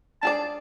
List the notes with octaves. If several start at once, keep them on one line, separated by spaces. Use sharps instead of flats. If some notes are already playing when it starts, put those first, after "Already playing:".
D4 G#4 D5 A5